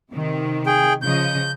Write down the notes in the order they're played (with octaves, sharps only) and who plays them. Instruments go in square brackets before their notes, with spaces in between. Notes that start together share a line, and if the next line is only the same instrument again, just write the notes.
[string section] C3 D#3
[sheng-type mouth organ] G#4 G5
[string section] C#3 F3 D#5 [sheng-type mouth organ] G6